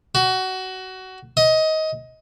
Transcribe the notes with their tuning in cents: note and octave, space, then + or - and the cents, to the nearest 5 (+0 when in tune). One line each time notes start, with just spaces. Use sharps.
F#4 +20
D#5 +20